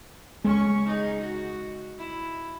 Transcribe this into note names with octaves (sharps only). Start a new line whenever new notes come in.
C#2 G#3 C#4 C#6
D#4 G#4
F#4
E4